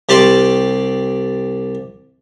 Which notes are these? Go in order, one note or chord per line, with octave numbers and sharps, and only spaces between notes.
C2 G4 D5 A5 C6